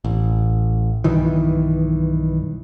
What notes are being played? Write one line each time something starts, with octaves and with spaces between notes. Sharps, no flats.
A1
B1 G2 D#3 E3